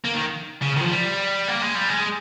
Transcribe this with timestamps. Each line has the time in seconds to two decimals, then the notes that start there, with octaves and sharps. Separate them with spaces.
0.04 A#3
0.14 D#3
0.62 C#3
0.76 D#3
0.81 F3
0.91 G3
1.48 A#3
1.62 G#3
1.75 G3
1.89 G#3